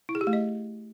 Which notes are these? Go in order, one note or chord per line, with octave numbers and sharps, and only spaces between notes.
E4
G#4
G4
A3
D#5